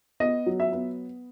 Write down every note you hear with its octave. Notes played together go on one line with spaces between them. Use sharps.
B3 D#5
F#3
E5
B3